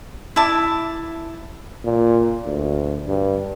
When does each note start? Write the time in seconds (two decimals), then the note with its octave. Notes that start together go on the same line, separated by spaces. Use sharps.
0.36 E4 E5 A5 D6
1.85 A#2
2.45 D2
3.07 G2